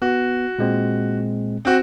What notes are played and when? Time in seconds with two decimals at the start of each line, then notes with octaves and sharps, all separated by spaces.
0.02 B3 F#4
0.59 A#2 G#3 C4
1.65 C4 F#4